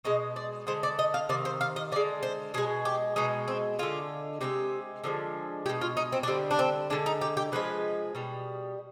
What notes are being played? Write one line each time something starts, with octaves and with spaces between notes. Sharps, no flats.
B2 G#3 D#5
D5
D3 G#3 C5
D5
D#5
F5
C3 D#3 D5
C5
F5
D#5
D3 G#3 D5
C5
B2 G#3 G#4
G4
B2 G#3 D#4
C4
D3 G#3 F4
C3 D#3 G#3 G4
D3 F3 G#3
B2 G#3 G4
F4
D#4
C4
D4
D3 G3 C4
D4
C4
D3 G#3 D4
D#4
G4
G4
D3 F3 G#3 B4
B2 G3